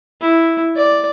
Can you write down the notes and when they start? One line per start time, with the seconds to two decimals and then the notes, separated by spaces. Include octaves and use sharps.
0.21 E4
0.76 D5